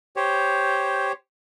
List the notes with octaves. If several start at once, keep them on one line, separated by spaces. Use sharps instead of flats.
G4 C5 C#5